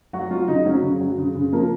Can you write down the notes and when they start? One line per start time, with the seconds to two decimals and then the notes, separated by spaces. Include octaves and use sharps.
0.13 F#3 F#4
0.30 F#3 F4
0.48 C#3 D#4
0.66 F#3 C#4
0.83 C#3
1.01 F#3
1.18 C#3
1.35 C#3
1.53 F3 A#3